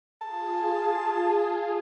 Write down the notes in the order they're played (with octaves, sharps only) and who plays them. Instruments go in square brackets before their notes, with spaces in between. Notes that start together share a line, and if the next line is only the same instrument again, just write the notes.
[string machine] F4 G#4 [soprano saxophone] A5